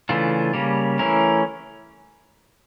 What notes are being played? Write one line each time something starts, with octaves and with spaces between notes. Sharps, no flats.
C#3 E3 A3 D4 F4
C#3 G3 A#3
E3 A3 C#4 E4 A#4